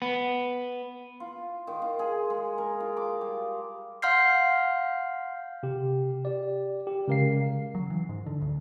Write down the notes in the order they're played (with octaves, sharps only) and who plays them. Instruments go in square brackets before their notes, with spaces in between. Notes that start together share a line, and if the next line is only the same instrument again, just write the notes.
[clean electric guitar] B3
[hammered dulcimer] F4
D#3
F4
G#4
G#3
A#4
F4
D6
G3
[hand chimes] F5 F#5 C6 F6 G6 C7
[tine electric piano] C3 G4
G4 D5
G4
C#3 G#3 A#4 F5 C7
[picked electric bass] F#3
E3
G#2
D3
D2